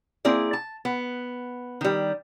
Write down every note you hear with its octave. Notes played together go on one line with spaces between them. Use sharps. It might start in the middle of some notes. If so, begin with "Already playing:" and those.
A#3 C4 E4 G#4 D5
A5
B3
D#3 G3